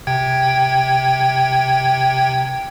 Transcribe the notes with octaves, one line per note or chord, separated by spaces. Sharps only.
C3 G5 G#6